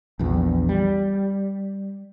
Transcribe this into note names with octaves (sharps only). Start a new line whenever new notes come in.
A#1 E2
G3